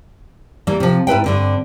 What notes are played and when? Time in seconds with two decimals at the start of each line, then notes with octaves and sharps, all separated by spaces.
0.67 E3 G3 A#3
0.80 C3 F3
1.07 G#2 E4 B4 G5
1.24 G2 D3 C4